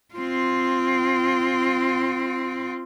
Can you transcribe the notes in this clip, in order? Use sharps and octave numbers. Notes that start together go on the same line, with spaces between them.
C4 F4